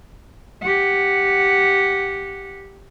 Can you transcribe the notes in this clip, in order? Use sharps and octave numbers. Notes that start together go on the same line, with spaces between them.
G4 F#5